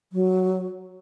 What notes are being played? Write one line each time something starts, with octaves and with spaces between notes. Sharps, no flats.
F#3